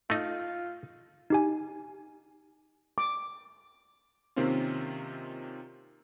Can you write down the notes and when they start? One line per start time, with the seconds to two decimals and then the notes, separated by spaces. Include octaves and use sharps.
0.10 A3 D#4 F4
1.30 D#4 G4 G#5
2.98 D6
4.36 C3 D#3 A#3 C4 C#4 F4